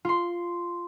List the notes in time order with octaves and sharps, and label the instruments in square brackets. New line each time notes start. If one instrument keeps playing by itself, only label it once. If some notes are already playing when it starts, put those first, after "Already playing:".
[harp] F4 C6